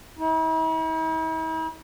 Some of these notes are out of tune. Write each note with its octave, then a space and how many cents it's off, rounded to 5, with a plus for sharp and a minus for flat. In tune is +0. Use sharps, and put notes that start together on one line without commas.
E4 -45